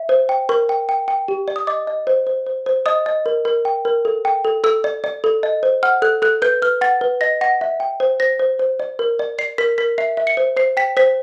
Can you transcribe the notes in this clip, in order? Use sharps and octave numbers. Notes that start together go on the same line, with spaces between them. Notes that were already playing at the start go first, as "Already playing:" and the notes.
Already playing: E5
C5
G5
A#4 C#6
G5
G5
G5
G4
D5
D#6
D#5 D6
D#5
C5
C5
C5
C5
D#5 D#6
D#5
A#4
A#4
G5
A#4
A4
G5
A4
A4 E6
D5
D5
A4
D#5
C5
F#5 F6
A4 F#6
A4 F#6
B4 G6
B4 F6
F#5 A6
B4
D#5 A#6
F#5 A#6
E5
G5
C5
C5 A#6
C5
C5
D5
A#4
D5
D5 C7
A#4 B6
A#4 B6
E5 C7
E5
C#7
C5
C5 C7
G5 B6
C5 B6